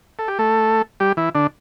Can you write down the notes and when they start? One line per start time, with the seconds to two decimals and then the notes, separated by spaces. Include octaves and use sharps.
0.19 A4
0.28 G4
0.39 A3 A4
1.00 G3 G4
1.17 E3 E4
1.35 D3 D4